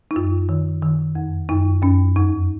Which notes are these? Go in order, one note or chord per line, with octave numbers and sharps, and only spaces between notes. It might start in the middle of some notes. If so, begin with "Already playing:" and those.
D#4
F#2 F4
D#3
D#3
F2
F#2 D#4
F#2 C#4
F2 D#4